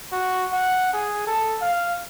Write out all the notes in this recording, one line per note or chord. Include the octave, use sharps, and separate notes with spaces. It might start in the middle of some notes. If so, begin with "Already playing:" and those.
F#4
F#5
G#4
A4
F5